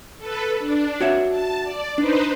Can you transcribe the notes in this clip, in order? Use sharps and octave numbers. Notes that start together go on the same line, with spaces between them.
A4 B4
D4
F#4 C#5 E5
A5
D5
D4 D#4 B4 C5